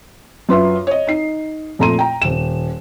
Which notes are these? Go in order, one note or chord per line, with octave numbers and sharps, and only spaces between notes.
F#2 F4 B4 E5 C6
C#5 D#5
D#4 C7
F2 A#2 A3 A#5 C6 D#7
G5 A#5
D#1 E7